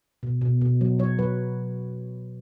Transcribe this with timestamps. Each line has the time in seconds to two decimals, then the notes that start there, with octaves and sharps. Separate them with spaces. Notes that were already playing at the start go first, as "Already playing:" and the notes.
0.23 B2
0.41 B2
0.61 B2
0.81 F#3
0.99 F#3 C#5
1.19 F#3 B4